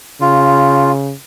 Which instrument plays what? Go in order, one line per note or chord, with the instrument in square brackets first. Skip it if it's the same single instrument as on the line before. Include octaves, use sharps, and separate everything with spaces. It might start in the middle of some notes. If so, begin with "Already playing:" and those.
[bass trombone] C#3 [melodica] F4